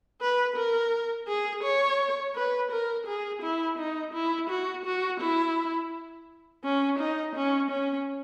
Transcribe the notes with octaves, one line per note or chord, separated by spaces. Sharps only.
B4
A#4
G#4
C#5
B4
A#4
G#4
E4
D#4
E4
F#4
F#4
E4
C#4
D#4
C#4
C#4